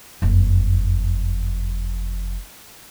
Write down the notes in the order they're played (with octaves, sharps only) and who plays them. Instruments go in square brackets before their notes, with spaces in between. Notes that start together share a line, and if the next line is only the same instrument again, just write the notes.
[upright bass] F#1 F2